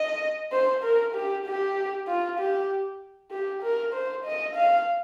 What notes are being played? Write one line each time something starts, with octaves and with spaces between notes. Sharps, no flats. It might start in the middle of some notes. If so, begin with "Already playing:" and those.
Already playing: D#5
C5
A#4
G4
G4
F4
G4
G4
A#4
C5
D#5
F5